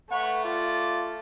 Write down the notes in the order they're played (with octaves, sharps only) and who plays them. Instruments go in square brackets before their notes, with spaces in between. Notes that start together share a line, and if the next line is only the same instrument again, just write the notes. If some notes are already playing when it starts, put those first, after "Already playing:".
[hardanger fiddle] A3 [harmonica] B4 C#5 C#6 [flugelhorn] F#5
[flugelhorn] F4 [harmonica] D5